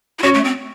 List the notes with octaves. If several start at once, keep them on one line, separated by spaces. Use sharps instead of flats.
E4
C#4 F#4
A3
C4